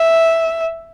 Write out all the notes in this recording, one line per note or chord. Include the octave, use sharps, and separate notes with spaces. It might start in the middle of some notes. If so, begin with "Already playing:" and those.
Already playing: E5